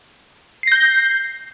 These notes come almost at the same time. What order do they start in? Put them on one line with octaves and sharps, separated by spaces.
C7 A#6 G6